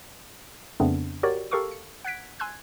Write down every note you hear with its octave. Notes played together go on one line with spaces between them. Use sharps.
F2 C#3 A3 B3 C4 D4
F#4 G4 A#4 C#5 D5
G4 A4 A#4 F5 C#6 D6
C#7
F#5 F#6 G#6 B6 D7
G#5 C6 E6 F#6 G#6